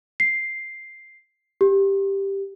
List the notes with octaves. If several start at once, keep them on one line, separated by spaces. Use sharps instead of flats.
C7
G4